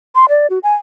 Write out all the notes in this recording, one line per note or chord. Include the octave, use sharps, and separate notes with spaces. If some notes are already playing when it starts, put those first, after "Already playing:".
C6
D5
F#4
G#5